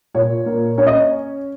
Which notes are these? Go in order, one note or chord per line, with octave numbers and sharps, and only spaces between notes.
A#2 C#5
A#3
C#4 C#5
D#5
C#5